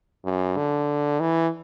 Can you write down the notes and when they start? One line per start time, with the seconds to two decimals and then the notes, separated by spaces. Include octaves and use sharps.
0.25 F#2
0.57 D3
1.20 E3